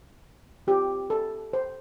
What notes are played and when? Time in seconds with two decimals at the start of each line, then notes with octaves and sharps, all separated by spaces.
0.67 C4 F4 G4
1.10 A4
1.53 C5